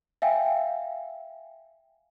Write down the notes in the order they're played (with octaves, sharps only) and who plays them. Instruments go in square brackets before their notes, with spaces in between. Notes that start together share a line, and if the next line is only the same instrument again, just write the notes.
[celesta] E5 F5 G5 G#5